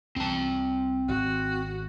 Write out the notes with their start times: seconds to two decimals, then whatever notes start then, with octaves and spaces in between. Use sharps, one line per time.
0.16 C2 C4 A5
1.08 G#1 F#4